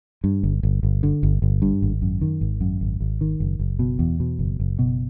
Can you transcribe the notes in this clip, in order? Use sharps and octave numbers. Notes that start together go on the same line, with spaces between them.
G2
G1
G1
G1
D3
G1
G1
G2
G#1
F#2
D#3
G#1
F#2
G#1
G#1
D#3
F#1
F#1
B2
E2
B2
F#1
F#1
B2